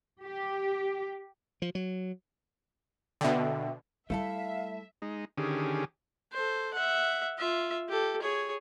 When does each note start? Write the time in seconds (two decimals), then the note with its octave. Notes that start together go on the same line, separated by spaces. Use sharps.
0.24 G4
1.62 F3
1.75 F#3
3.21 B2 D3 E5 G5
4.10 G3 A3 E4 A4 E5 F5
5.02 G#3 D#4
5.37 D3 D#3 C#4 G4 G#4
6.33 A4 C5
6.74 E5 F#5
7.38 F4 E5
7.89 G4 A4
8.22 G#4 C#5